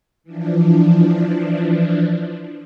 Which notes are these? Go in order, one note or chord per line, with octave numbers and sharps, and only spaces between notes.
E3 F3 D4